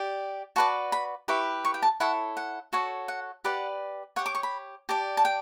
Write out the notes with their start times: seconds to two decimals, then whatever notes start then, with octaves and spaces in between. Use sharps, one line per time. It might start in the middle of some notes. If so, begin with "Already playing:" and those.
Already playing: G4 D5
0.56 F#4 B4 D5 A5
0.92 B5
1.28 E4 G4 B4 C#6
1.65 C#6
1.74 G5
1.82 A5
2.00 E4 A4 C#5 F#5
2.37 F#5
2.73 F#4 A4 C#5
3.08 F#5
3.44 G4 B4 D5 F#5
4.16 G4 C#5 F#5
4.26 D6
4.35 C#6
4.43 B5
4.89 G4 D5 A5
5.17 A5
5.25 G5